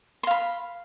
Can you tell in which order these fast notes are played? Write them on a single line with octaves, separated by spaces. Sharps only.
C6 F5 B5